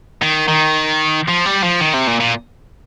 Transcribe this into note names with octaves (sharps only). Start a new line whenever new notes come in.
D#3
D#3
F3
G3
F3
D#3
C3
A#2
A#2